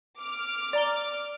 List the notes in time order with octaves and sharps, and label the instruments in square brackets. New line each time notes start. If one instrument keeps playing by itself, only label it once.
[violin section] D6 F6
[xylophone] D5 A#5 G7